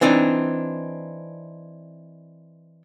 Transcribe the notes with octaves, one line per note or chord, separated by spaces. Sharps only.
E3 C4 D4 D#4